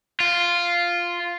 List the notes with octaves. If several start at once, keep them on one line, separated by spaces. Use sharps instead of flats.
F4